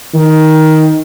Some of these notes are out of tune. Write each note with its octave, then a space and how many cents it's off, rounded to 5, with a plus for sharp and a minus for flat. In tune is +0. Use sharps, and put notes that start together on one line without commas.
D#3 +10